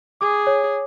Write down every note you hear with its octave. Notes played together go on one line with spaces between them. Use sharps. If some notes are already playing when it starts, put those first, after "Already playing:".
G#4 D6
C#5